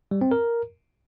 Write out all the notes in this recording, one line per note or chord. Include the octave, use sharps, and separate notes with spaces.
G3
C4
A#4